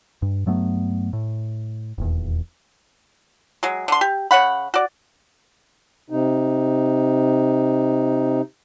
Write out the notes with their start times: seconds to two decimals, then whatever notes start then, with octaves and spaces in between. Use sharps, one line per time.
0.22 G2
0.46 G2 F#3 A3 B3
1.13 A2
1.98 D#1 E2
3.63 F#3 G#3
3.88 D3 C6
4.01 G4
4.31 C#3 C#5 F#5 B5
4.74 F#4 D5
6.10 C3 D#4